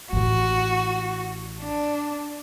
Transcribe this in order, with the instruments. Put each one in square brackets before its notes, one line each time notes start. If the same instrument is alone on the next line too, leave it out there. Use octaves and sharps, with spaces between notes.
[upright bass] A1 E4 [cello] F#4
[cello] D4